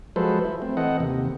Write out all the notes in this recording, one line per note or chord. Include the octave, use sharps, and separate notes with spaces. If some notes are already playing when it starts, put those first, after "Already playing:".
F3 F#3 G#3 A4 B4 C5
E4
A3 C4
E3 C4 A4 D#5 F#5
D#2 C3